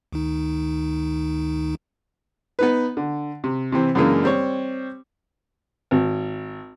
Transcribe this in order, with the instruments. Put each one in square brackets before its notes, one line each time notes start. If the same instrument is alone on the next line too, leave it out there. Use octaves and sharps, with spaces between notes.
[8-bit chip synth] D2 D#3 D#4
[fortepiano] B3 D#4 B4
D3
C3
C3 E3 C4
F#2 C#3 E3 G#3 A#3 D4
G3 C4 C#5
G#1